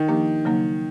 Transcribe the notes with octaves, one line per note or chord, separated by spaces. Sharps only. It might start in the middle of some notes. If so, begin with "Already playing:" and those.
Already playing: D#3
F3 A#3 D4 G4 A#4
C#3 F#3 A#3 D#4